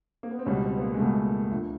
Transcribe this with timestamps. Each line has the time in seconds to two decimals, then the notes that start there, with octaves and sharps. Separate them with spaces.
0.23 A#3
0.31 B3
0.39 C4
0.46 C#2 B2 G3 C#4
0.63 C4
0.76 B3
0.81 A#3
0.94 G#3
0.99 C#2 B2 G3 A3
1.51 D2 D3 F3